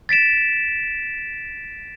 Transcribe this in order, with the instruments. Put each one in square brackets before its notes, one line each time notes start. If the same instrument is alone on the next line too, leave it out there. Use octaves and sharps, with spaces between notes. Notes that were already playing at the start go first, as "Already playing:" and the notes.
[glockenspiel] A6 B6 D7 E7